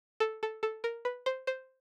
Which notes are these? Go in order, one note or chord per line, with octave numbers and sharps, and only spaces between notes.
A4
A4
A4
A#4
B4
C5
C5